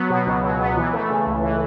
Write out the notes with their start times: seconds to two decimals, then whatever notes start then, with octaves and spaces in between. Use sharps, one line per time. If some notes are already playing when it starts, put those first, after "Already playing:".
Already playing: F#3 B3
0.10 B2
0.27 C#2
0.43 F#3
0.60 B3
0.77 E3
0.93 A3
1.10 C#3
1.27 C#2
1.43 E3